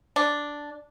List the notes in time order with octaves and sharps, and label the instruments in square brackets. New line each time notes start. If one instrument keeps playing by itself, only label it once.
[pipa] D4